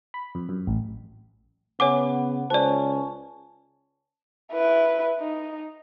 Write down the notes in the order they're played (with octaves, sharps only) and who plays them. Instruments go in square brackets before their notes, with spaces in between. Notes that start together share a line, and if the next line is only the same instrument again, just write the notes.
[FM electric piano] B5
F2
F#2
A1
[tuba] C#3 [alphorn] B3 [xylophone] C#5 G#5 D6 [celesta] F#5
[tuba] C#2 [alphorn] C#4 [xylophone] C5 D5 [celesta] A5
[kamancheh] E4 B4
D#4